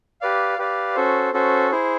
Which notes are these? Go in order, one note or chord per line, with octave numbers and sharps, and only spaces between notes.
G4 B4 D5 F5
G4 B4 D5 F5
C#4 F#4 A4 C5
C#4 F#4 A4 C5
E4 G#4 C5